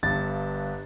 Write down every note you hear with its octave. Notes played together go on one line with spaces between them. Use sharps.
G1 G2 A6